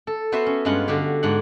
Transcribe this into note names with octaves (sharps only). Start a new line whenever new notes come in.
A4
B3 F#4 C5 E5
C#4
G2 G#3 C#4 F4 F#5
D3 F#4 G4 F5
G#2 D4 F#5